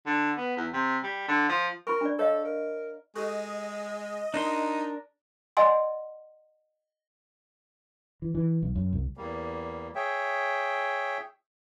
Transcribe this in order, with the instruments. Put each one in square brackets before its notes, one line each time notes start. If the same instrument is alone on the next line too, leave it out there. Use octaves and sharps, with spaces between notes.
[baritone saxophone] D3
B3
E2
C3
G3
D3
F3
[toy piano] E4 B5 C#6 [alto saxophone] A#4
[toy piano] D4 D5
[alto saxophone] A4 [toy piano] C#5 D#5 F5
[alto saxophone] A#4
[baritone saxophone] G#3 [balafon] G4 A4 C#6 [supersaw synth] D#5
[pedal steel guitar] D4 A#4 C6 [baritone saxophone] D#4
[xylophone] D5 D#5 F#5 G#5 C6
[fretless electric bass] E3
E3
B1
F#2
C2
[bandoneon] E2 G3 A#3
G#4 C#5 E5 G5